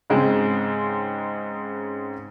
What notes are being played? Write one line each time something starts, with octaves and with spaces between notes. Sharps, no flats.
G#2 C#3 G#3 C4